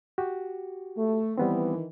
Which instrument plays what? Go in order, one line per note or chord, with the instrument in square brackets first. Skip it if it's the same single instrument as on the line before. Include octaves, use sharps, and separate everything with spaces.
[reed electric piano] F#4 G4
[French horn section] A3
[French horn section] D#3 E3 [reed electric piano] G3 B3 C4